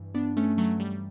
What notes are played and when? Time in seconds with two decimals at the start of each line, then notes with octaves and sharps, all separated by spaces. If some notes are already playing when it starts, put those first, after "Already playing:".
Already playing: G2 E3
0.14 B3 D4
0.37 A3 C#4
0.58 F#3 A3
0.80 G3